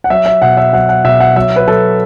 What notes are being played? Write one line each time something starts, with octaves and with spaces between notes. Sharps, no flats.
F#5
F#3 E5
E5
B2 F#5
E5
F#3 F#5
F#5
B2 E5
F#5
F#3 E5
B4
F#3 A4